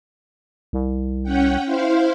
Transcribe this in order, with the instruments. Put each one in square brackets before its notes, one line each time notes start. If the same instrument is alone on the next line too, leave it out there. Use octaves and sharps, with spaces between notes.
[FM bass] C2
[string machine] C#4 F#5 G5
E4 C5 F5